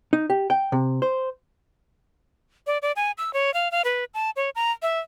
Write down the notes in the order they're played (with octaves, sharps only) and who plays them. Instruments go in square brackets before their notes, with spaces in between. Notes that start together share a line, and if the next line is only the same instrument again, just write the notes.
[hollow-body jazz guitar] D#4
G4
G5
C3
C5
[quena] D5
D5
G#5
E6
C#5
F5
F5
B4
A5
C#5
A#5
E5